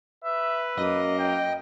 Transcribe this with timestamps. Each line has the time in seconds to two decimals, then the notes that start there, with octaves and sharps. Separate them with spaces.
0.24 B4 E5
0.78 F#2 A#3 D#5
1.19 G5